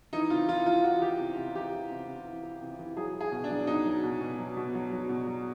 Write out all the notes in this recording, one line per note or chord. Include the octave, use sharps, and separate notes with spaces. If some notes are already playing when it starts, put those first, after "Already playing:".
E3 D#4
C3 F4
E3 F4
E3 F4
E3 F#4
E3 G4
C3
C3
E3 G4
E3
C3
C3
E3
E3
C3
E3
F#3 G#4
F#3
G#4
B2
D4
F#3
B2 D#4
F#3
B2
B2
F#3
B2
F#3
F#3
B2
F#3